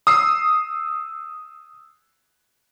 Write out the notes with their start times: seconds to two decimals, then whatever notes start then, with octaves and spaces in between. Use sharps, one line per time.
0.07 D#6 E6 C7